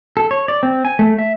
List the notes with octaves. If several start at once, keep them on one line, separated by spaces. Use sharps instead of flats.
A4
C#5
D5
C4
G#5
A3
E5